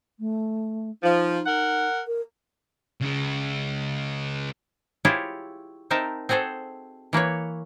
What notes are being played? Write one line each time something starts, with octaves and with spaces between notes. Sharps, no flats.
A3
F3 D#4
A#4 F#5
A#4
C#3 G#3
E4 F4 G4 G#4 C#5
C4 D#4 A#4 E5 A5
C4 F#4 G#4 A4 C5
E3 A#3 B4 C#5